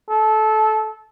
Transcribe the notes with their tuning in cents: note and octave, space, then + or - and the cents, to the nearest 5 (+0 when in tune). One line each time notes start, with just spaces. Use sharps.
A4 -20